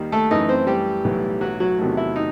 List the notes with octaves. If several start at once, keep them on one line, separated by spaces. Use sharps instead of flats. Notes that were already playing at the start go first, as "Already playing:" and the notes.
Already playing: D#2 D#3 G3
A3 A4
F#2 E3 A3 D#4 D#5
C4 C5
G3 G4
B1 A2 E3
F#3 F#4
F#3 F#4
E2 C3 D#3 F#3 A3
E4
D#4